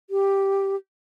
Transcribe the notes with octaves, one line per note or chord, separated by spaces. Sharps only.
G4